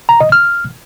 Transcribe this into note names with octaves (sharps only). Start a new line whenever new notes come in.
A#5
D#5
F6